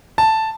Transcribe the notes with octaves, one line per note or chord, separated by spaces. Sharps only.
A5